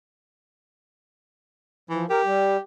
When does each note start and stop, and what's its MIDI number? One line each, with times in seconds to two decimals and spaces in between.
1.90 2.04 52
1.90 2.06 53
2.10 2.59 67
2.10 2.22 70
2.25 2.57 55